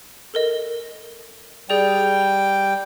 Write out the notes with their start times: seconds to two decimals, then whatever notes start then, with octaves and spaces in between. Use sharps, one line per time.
0.34 A4 A#4 D#5
1.69 G3 G#4 D5 G5 F7